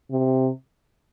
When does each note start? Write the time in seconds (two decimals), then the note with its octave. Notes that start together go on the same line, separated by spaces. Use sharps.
0.11 C3